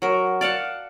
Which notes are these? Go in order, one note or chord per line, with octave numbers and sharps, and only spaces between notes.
F#3 A#4
D5 F5 F#5 A5